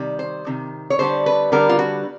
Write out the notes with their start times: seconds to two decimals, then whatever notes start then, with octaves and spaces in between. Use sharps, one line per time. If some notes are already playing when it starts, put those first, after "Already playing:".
Already playing: C3 D#3 G3
0.19 C5
0.46 C3 D#3
0.90 C#5
0.99 D3 G3 B3 C5
1.26 B4
1.52 D3 G3 B3 A#4
1.69 F4
1.79 F#4